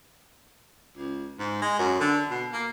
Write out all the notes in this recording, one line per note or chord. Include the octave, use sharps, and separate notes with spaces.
C#2
G#2
G#3
F#2
D3
B2
A#3